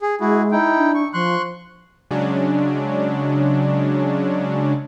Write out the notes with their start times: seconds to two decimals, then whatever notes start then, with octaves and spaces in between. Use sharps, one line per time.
0.02 G#4
0.20 G#3 E4 F#4 G#4
0.51 D#4 E4 G5
0.77 D4
0.95 C#6
1.13 F3 C6 C#6 F#6
2.11 C#3 F#3 G#3 D4